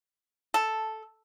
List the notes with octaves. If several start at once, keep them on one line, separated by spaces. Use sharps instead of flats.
A4